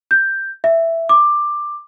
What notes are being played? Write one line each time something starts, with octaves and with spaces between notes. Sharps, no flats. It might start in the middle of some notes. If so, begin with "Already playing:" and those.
G6
E5
D6